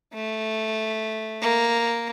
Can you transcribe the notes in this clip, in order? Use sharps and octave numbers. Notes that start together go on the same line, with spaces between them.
A3
A#3